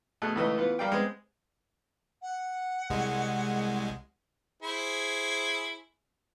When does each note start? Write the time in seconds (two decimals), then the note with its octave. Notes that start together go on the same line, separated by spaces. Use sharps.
0.22 B2 A3 G#4 A5 F#6
0.36 C#2 E3 A3 B4 D#5 E6
0.58 E3 B3 F4 B4
0.79 G3 A#4 D5 F5 G5
0.92 G#3 B3 C4
2.22 F#5
2.90 C2 G#3
4.62 E4 G#4 C5